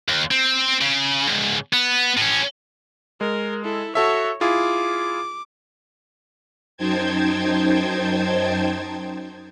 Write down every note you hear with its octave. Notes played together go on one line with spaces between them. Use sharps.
D#2
C4
C#3
C#2 G#2
B3
A2 C#4
G#3 A#4
E4 A4
F#4 A4 C#5 E5
E4 F4 G#4 D6
F#2 D#4 C5 G5 A5 G#6